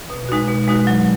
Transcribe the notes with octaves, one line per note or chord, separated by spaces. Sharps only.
B2
G#3 D#4 F#4
B2
G#3 D#4 F#4
F#3